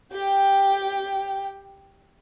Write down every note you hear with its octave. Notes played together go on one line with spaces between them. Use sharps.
G4 G5